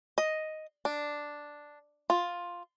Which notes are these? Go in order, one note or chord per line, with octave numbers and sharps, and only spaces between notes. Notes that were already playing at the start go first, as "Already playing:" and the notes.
D#5
D4
F4